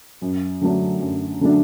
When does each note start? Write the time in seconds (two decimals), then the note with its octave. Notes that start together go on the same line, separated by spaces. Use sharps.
0.22 F#2
0.61 D3 F#3 A3 D4
1.01 F#2
1.41 D3 F#3 A3 D4